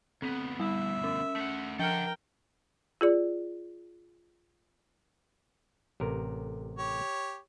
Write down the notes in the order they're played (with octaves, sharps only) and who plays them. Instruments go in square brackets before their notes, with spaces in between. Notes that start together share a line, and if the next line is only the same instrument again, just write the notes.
[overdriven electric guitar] D2 B3 [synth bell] C4
[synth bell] G3 B5 [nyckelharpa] E5
[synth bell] C#4
[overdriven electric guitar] A3 F#5
[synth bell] F3 F6 [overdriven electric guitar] A4 F#5 [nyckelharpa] A#4 G5
[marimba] F4 G#4 D5
[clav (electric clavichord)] A1 C3 A#4
[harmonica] G4 C#5